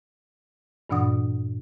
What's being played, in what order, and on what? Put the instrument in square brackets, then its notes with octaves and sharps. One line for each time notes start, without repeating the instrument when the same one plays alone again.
[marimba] G2 A#2 E3 D4 F#5 D#6